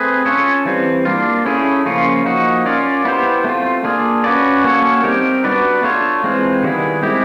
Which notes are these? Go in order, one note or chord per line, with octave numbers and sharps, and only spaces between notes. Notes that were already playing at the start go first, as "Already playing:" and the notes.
Already playing: A3 C4 G#4 B4
C#4 F4 A4 C#5
E3 G3 C4
A#3 D4 F4
A3 C#4 E4 G#4
C#3 F3 A#3 C#4 F4
F3 A#3 D#4 F#4
C#4 F4 A#4 D5
B3 E4 G4 C5
A3 C4 F4
A#3 D4 F4 G#4
C#4 F#4 B4 D5
A#3 C#4 F#4 A4 C#5
G3 C4 D#4 G4 A#4
B3 D4 F#4 B4 D5
A3 D4 F4 A4 C#5
E3 G#3 C4 F4
D#3 G3 B3 E4 G#4
G#3 C4 E4 G4